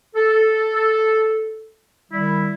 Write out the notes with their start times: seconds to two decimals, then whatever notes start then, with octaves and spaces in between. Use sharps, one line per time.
0.16 A4
2.12 D#3 G3 E4